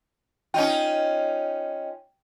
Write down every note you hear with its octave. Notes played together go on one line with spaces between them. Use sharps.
C#4 D#4 F4 G5